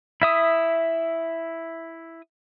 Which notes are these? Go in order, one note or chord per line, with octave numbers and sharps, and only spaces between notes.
E4 E5 D#6